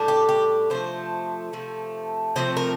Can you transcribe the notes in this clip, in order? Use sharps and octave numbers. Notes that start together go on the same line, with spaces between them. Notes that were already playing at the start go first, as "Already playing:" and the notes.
Already playing: A2 G3 D4
G4
G4
C3 F3 A3 C5
C3 F3 A3
C3 F3 A3 C4 C5
A#4